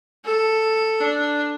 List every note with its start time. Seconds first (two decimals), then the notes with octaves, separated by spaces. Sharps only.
0.25 A4
1.00 D4